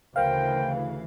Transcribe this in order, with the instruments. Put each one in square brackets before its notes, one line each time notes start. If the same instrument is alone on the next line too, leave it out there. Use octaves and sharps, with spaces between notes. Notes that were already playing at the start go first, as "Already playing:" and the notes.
[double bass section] D2 C#3 E3 [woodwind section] A#4 C5 G5 [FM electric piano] F5